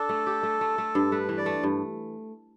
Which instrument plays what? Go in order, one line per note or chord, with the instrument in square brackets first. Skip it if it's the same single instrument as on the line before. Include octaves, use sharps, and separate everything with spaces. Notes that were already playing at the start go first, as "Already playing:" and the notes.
Already playing: [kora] D4 [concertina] A4
[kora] A3
G4
A3
A3
A3
G2
[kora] A3 [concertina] B4
[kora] E3
[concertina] D5
[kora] A3
G2